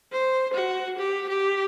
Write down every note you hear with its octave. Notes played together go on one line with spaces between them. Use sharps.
C5
F#4
G4
G4